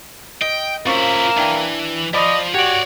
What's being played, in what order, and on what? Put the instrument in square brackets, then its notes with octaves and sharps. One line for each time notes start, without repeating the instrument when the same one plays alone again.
[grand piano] D#5 [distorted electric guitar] G5
[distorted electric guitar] F3 E4 [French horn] A#3 [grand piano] C#4 C5 C#6
[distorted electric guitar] E3 [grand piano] D4 G5
[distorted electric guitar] F3 [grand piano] D5 B5 D6 [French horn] D#5
[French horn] F#4 [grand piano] G4 [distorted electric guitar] C#5 D5